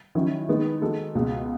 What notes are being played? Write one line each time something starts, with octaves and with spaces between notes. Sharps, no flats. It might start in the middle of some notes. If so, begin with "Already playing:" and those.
D#3 F#3 C#4 E4
D#3 G#3 B3 D#4
D#3 G#3 D#4 F#4 A4
C#2 B2 G#3